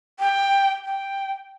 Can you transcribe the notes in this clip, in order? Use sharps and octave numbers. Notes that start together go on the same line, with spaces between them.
G5
G5